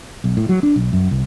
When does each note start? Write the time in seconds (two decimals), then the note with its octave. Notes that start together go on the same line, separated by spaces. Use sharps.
0.24 B1
0.37 A2
0.49 F#3
0.63 D4
0.76 B1
0.93 F#2
1.11 C2